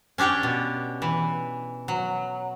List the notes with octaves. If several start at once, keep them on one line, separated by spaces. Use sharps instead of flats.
C#4 D4 G4 C#5 G5
B2
E3
F#3